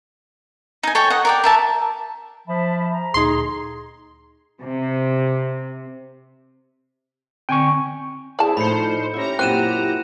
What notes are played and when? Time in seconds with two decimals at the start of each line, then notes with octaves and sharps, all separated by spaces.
0.83 D#4 G#5
0.95 A4 C#5 G5 G#5
1.10 D#5 F#5
1.25 A#4 D5 G5
1.44 A#4 E5 A5
2.47 F3 E5 A5 B5
2.92 A#5
3.14 D2 A#2 D#4 G#4 C6
4.61 C3
7.49 D3 C4 G5 G#5 C#6
8.39 C4 E4 G#4 D5 A5
8.57 A2 F3 D#4 C5 B5 C#7
9.14 C#4 E4 G4 E5 A#5
9.39 F#2 A#2 C4 F#6 D#7 E7